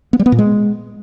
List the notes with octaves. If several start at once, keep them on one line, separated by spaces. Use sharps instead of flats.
B3
G3
B3
A#2
G#3